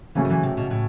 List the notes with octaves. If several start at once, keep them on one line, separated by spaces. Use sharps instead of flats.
C#3 E3 F#3 A3 C#4
D#3
E3
C3
B2
A2